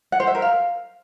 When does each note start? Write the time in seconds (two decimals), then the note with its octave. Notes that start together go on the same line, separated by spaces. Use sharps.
0.12 F#5
0.20 C5
0.27 E5
0.35 A#4
0.42 F5